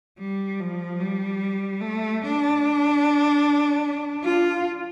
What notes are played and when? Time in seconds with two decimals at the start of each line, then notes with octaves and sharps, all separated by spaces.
0.19 G3
0.60 F3
1.00 G3
1.81 A3
2.22 D4
4.24 F4